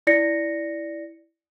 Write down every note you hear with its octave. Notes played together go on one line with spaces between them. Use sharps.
E4 D5 A#6 C#7